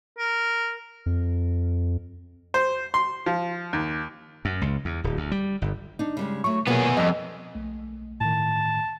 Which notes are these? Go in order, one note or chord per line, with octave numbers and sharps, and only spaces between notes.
A#4
F2
C5
C6
F3
D#2
F#2
C#2
E2
D1
D2
G3
G1
D4 D#4
C#3 G3 G#3
F#3 A3 C#6
B2 F#3 A#3 B3 F4 G#4
F2 G3 B3 D#5
B1 A3
A2 D#3 A5